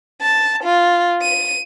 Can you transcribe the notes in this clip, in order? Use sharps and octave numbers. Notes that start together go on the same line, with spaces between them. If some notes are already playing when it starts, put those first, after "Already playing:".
A5
F4
D#7